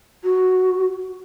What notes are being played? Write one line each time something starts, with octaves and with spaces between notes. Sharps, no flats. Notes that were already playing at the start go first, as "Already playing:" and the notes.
F#4